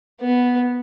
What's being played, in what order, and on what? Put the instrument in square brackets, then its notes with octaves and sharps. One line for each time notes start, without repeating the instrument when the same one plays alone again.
[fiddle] B3